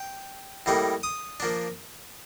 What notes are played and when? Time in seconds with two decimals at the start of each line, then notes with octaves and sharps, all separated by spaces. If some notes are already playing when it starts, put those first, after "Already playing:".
Already playing: G5
0.66 A2 G3 A#3 D#4
1.03 D#6
1.40 F3 A#3 D4